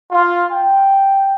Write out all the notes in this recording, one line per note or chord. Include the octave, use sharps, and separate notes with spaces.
F4
G5